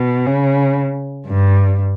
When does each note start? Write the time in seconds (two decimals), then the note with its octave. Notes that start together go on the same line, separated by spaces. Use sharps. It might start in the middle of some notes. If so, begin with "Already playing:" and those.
Already playing: B2
0.26 C#3
1.27 G2